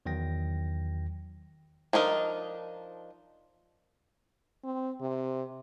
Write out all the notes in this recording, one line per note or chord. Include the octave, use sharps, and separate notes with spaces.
E2 D#3 F#3 G5 A#6
F3 D4 D#4 A#4
C4
C3